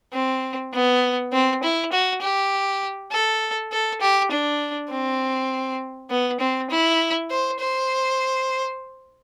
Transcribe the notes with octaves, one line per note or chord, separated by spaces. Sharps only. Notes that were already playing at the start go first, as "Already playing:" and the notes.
C4
B3
C4
E4
F#4
G4
A4
A4
G4
D4
C4
B3
C4
E4
C5
C5